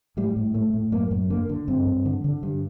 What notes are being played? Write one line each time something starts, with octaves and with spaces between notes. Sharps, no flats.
A2 G3
A2
A2 A3
A2
F#2 A#3
F#2
D3 A#3
D3
G2 C4
G2
D3
D3
G2